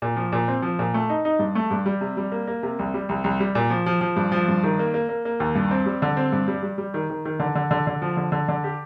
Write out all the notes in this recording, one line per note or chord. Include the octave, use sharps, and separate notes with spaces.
A#2
F3
A#2
C4
F3
A#2
A3
D#4
D#4
G2
A3
G2
G3
C3
G3
A#3
A#3
C3
C2
G3
C2
C2
G3
A#2
F3
F3
F3
G2
F3
G2
D#3
A#3
A#3
A#3
A#3
D#2
G2
C4
G3
D3
C4
G2
G3
G3
G3
D#3
D#3
D#3
D3
D3
D3
D3
F3
D3
D3
D3
G4